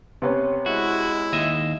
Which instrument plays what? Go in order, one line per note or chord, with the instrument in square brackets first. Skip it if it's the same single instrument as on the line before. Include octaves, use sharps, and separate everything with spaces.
[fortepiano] C3 B3 C#4
[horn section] G#3 E4 [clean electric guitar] F#4
[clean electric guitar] D#2 D#5 E5